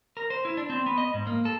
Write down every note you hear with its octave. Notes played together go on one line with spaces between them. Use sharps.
A#4
C5
E4
D4
C4
B3
D#5
G#2
A#3
A4